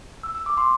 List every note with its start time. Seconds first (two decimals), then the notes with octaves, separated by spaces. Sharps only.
0.23 E6
0.35 E6
0.46 D6
0.57 C6